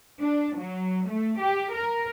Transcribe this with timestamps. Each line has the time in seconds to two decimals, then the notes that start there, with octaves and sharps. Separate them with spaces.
0.20 D4
0.56 F#3
1.07 A3
1.39 G4
1.72 A#4